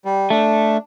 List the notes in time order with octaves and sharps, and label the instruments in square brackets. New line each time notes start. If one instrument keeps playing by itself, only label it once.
[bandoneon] G3
[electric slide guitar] A3 [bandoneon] D4